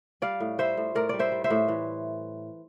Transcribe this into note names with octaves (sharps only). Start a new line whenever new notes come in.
G3 D5 F5
A2
G3 C5 E5
A2
A2 A#4 D5
G3 D5
C5 E5
G3
C5 E5
A2
E3